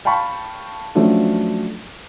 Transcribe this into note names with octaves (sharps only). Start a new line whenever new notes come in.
F5 G5 A5 B5 C#6
F3 F#3 A3 C#4 D4 F4